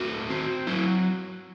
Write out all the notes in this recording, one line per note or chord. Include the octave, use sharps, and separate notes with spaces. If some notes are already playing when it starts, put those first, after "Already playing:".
Already playing: A3 C4 F#4
C4
F#3 E4